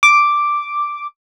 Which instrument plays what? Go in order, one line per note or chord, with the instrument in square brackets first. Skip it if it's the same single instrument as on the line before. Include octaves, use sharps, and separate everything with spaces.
[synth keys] D6